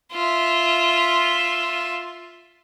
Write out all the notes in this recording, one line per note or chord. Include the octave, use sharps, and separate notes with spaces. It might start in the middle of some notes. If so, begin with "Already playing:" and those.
F4 E5